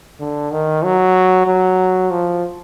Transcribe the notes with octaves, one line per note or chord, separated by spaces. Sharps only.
D3
D#3
F#3
F#3
F3